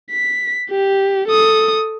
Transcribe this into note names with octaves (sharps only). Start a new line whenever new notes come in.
B6
G4
A4 D#6